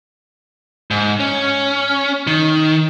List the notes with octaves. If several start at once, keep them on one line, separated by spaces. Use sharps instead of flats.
G#2
C#4
D#3